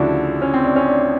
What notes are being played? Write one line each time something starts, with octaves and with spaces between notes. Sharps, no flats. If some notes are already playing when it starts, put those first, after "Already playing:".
Already playing: D2 C#3 F3 D4 E4 F#4
C#4
C4
D4
C#4
D4